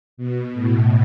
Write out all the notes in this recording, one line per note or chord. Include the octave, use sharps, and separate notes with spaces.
B2
A2